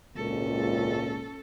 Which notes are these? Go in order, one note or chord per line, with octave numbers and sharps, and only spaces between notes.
G#1 C#2 A#2 C#4 A4